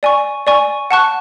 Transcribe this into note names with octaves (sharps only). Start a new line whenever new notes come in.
D5 G#5 C#6
D5 G#5 C#6
F#5 A5 C#6 F#6